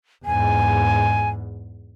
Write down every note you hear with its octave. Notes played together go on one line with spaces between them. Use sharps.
E2 G#2 G#5